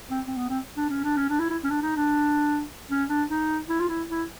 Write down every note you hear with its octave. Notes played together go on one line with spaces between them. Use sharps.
C4
C4
B3
C4
D4
C#4
D4
C#4
D4
E4
E4
C#4
D4
D#4
D4
C#4
D4
D#4
E4
F4
E4
E4